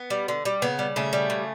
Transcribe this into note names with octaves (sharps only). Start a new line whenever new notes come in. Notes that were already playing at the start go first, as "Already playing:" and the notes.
Already playing: B3
G3
D3
G3
C#3 B3
G3
C#3 A3
G3
C#3